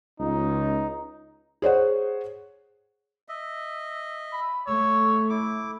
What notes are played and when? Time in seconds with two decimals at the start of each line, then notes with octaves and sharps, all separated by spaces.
0.20 C#2 D#4
1.62 G#4 C5 C#5 F#5
3.29 D#5 E5
4.33 B5
4.67 A3 C#5 E6
5.29 E4 D6